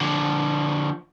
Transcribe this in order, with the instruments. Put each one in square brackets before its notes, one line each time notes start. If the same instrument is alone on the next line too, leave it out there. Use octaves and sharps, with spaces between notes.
[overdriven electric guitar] D3 F3